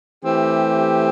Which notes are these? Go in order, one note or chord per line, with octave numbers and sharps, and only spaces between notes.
E3 A3 C4 G4